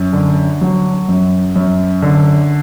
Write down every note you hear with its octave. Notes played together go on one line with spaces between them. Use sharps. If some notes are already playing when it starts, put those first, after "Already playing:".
Already playing: F#2
D3
F#3
F#2
F#2
D3